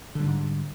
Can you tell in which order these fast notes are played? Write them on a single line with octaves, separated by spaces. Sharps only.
D3 G3 G#2